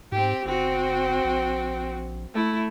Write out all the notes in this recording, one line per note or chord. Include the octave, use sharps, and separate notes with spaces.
G#2 C4 G4
G1 C4 F#4
A#1
A3 E4